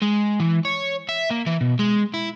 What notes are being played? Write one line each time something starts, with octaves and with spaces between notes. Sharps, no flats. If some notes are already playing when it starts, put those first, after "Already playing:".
G#3
E3
C#5
E5
A#3
E3
B2
G#3
E4